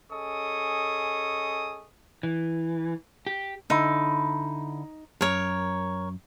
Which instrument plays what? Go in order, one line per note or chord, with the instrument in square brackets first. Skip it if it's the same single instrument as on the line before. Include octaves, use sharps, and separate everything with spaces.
[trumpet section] C#4 G#4 A4 D#5 C#6 D#6
[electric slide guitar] E3
G4
[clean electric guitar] D3 E4 [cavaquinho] D#4
[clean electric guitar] F#2 [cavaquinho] A#4 C#5